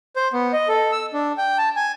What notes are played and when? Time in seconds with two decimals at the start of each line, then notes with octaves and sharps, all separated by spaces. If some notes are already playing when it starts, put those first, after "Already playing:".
0.16 C5
0.33 B3
0.53 D#5
0.68 A4
0.92 E6
1.13 D4
1.38 G5
1.58 A5
1.76 G#5